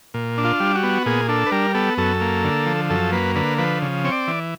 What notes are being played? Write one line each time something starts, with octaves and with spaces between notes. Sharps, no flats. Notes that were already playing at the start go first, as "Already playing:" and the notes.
A#2
D4
F4
G3
F#4
B3
A#2 G#4
D4 A4
B4
G3 A#4
B3 A4
F#2 A4
A#3
D3
F3
F#2 A4
A#3 B4
D3 B4
F3 B4
C#3
C4 C#5
D5
E3